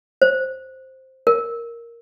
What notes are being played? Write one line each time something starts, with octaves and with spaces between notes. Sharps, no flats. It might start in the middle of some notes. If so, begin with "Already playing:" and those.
C5
A#4